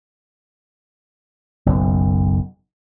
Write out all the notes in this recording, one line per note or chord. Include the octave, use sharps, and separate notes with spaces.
F#1 B1 F#2